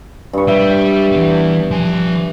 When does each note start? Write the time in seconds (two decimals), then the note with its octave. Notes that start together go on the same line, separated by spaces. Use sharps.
0.33 G2 C#6
0.48 G3 E5
1.12 E3 B3
1.71 F3 G#5